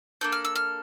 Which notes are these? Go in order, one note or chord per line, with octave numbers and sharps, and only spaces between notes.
A#3 D4 A4 G6
F6
E6
F6